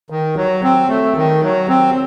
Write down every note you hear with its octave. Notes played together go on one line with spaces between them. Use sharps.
D#3
F#3
C4
A3
D#3
F#3
C4